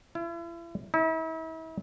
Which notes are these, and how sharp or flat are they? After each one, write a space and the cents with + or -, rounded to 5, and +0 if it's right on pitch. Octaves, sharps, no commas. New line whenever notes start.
E4 +40
E4 -40